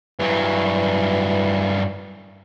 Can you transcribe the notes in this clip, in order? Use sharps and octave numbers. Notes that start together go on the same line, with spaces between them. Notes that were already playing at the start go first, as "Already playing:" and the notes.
G2 E3 F#3